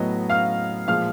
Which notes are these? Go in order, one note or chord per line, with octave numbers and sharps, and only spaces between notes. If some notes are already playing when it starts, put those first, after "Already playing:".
Already playing: A2 F#3 B3 D#5
F5 F6
A#2 F3 G#3 F5 F6